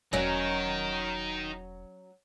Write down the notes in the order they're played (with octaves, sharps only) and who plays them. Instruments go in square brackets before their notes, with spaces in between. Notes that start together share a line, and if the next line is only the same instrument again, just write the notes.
[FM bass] E1 [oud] F#3 C#4 [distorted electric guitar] D#4 A#4